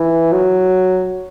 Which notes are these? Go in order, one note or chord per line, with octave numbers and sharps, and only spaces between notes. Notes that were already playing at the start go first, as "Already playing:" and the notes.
Already playing: E3
F#3